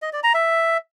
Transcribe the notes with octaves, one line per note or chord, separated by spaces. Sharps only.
D#5
D5
A#5
E5